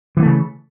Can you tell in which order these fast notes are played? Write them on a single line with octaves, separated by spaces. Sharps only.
E3 B3 A3 C#3